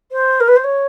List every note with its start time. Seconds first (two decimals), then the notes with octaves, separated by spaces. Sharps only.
0.11 C5
0.40 A#4
0.47 B4
0.56 C5
0.63 C#5